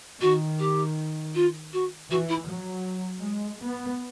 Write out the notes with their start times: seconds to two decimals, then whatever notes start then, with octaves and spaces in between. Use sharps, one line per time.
0.21 D#3 F#4
0.59 G4
1.34 F4
1.73 F#4
2.10 E3 F#4
2.29 E4
2.47 F#3
3.23 G#3
3.61 B3